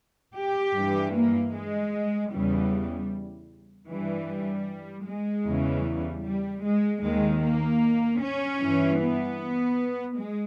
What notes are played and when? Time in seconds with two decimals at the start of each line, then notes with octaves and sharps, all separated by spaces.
0.35 G4
0.74 G2 E3
1.13 A#3
1.53 G#3
2.31 E2 C#3 E3 G3
3.88 G2 E3 G3
5.06 G#3
5.46 E2 C#3 E3
5.84 G3
6.24 G3
6.63 G#3
7.02 D#2 D#3 G#3
7.42 A#3
8.20 C#4
8.59 G2 E3
8.99 B3
10.16 G#3